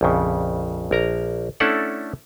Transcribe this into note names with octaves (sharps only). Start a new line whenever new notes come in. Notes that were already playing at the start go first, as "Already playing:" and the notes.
A#1 F2 C#3
A#1 A#4 A#5
A3 C#4 D4 E4 A4 F#5